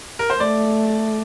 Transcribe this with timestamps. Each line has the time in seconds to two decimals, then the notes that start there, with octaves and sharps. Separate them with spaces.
0.19 A#4
0.30 C5
0.40 A3 D5